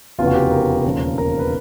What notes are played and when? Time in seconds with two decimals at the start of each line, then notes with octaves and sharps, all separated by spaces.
0.18 F1 E2 C#3 E3 F4
0.27 F#4
0.35 G4
0.51 A#4
0.85 E1 D#2 C#3 F3
1.18 A#4
1.39 B4